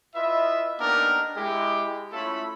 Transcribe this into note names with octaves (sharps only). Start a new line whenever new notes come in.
E4 F4 B4 D#5 E5
A#3 B3 D4 D#4 G4 A#4
G#3 E4 G4
A3 C#4 E4 F4 A4 B5